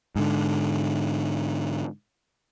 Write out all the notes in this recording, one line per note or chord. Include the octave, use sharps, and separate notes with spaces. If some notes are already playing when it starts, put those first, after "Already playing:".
G#2 D3